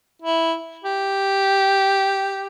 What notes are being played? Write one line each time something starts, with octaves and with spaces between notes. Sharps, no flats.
E4
G4